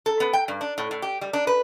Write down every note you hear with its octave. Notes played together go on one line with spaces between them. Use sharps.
A4
B3
G5
G2
D4
A2
A2
G4
G3
D4
B4